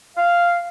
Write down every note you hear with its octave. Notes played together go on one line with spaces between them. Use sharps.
F5